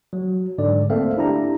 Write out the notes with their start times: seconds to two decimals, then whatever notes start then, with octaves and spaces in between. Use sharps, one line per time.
0.13 F#3
0.58 G#2 D3 D5
0.90 A3 A#3 C4 A4 E5 F5
1.17 D4 E4 G4 A#5